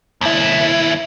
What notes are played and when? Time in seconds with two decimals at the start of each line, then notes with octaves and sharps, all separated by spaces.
0.21 D#2 E4